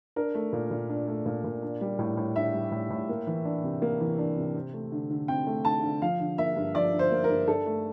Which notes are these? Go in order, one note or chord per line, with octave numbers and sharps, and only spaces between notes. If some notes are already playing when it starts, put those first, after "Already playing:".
D4 A#4
A3
A#2
A#2
D4
A3
A#2
A#2
D4
G3
A2
A2
D4 E5
G3
A2
A2
A#3
E3
D4
C3
A#3
E3
D4
C3
C4
A3
D3
D3
C4 G5
A3
D3 A5
D3
F3 F5
D3
A#3 E5
G2
F3 D5
D3
C5
A#3
A#4
G2
D4 A4
A3